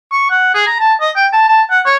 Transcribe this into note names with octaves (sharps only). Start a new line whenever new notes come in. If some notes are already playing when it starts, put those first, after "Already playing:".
C#6
F#5
G#4
A#5
A5
D#5
G5
A5
A5
F#5
C#5